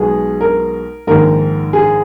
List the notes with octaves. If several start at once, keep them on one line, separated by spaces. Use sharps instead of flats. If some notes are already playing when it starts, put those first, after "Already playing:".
Already playing: B1 B2 G#3 B3 G#4
A#4
A#1 G#2 D#3 A#4
G#4